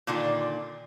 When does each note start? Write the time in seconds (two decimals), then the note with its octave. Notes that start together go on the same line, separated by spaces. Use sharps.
0.07 A#2 D3 D#3 D4 F4